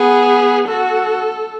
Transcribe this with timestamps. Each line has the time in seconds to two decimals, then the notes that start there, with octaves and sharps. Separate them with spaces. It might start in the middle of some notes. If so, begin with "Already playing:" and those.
Already playing: B3 G#4
0.68 F#4 A4